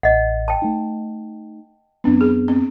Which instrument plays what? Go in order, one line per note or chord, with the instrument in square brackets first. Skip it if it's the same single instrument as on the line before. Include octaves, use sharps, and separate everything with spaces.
[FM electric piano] A1 [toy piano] D#5 F#5
[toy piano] G5 A5
[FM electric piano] A3 D#4
[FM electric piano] F#2 B3 [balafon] C4 D4
[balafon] G#4
C4